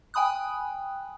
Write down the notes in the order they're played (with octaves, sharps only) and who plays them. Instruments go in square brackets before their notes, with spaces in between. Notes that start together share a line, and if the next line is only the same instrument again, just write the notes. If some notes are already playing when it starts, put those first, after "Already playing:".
[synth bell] G5 G#5 B5 D#6 F#6